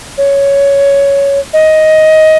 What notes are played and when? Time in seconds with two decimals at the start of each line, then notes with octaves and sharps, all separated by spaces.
0.18 C#5
1.53 D#5